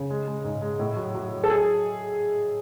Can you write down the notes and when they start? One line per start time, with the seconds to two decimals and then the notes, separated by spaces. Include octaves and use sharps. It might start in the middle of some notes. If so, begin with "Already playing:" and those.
Already playing: C#3
0.10 G#3
0.27 G#3
0.44 G#2
0.62 G#3
0.79 A2
0.97 F#3
1.15 F#3
1.32 F#3
1.44 A4
1.50 G#4